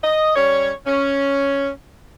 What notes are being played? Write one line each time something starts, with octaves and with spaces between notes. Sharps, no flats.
D#5
G3 C#4 C#5
C#4